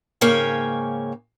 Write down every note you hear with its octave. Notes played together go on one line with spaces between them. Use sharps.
G#2 C#3 A#3 C#5 G5 G#5